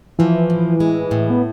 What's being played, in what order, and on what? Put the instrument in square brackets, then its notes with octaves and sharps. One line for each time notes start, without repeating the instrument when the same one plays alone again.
[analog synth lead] E3 [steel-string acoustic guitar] F3
[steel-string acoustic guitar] A2
G#3
A2
[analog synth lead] B3